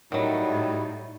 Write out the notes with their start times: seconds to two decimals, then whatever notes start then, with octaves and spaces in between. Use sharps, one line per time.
0.12 A2 D#3 F#3 G3 D#4 E4 F#4